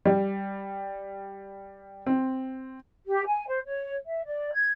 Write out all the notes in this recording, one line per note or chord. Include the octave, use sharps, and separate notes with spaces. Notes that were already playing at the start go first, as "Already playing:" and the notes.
G3
C4
G4
G#5
C5
C#5
E5
D5
G#6